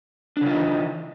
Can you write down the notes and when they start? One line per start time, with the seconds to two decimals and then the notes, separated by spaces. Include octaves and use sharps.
0.37 D4
0.41 C#3
0.46 F4
0.50 D#4
0.55 E3